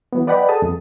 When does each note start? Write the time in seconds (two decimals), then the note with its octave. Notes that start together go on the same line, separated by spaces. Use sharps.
0.13 E3 F#3 B3
0.27 B4 D5 D#5 F#5 G5 B5
0.49 G#4 A4 A5 D#6
0.62 F2